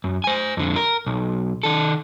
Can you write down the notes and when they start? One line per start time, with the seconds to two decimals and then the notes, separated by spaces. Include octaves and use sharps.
0.04 F#2
0.24 C5 G#5
0.57 F2 D3
0.76 A#4
1.07 B1
1.63 D#3 A4